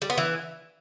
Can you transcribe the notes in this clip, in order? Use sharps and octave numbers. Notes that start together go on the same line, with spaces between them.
G3
B3
E3